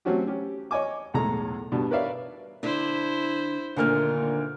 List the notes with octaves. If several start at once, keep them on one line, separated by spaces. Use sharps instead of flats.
F#3 A3 C4 C#4 F#4 G4
C#4 G4
C#5 D#5 G#5 D6
B1 E2 A2 G#3 A4 A#5
G2 B2 G3
A#4 B4 C#5 D5 E5 F5
D3 D4 E4 C5
D2 A#2 D3 D#3 A#3 F4 F6